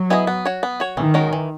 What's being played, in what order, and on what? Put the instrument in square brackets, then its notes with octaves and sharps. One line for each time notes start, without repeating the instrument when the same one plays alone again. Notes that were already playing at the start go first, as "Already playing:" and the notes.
Already playing: [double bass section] F#3
[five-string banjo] B3 E4 G#4 D#5
B3
F#4 C#5
B3
F#4 C#5
[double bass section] D#3 [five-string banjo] E3
[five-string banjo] G#3 C#4 F#4 A#4
E3